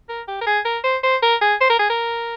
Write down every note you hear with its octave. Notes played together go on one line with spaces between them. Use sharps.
A#4
G4
A#4
G#4
A#4
C5
C5
A#4
G#4
C5
A#4
G#4
A#4